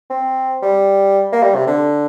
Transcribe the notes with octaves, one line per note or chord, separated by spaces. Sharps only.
C4
G3
A#3
G3
C3
D3